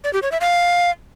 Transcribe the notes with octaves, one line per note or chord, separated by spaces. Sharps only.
D5
G4
C#5
E5
F5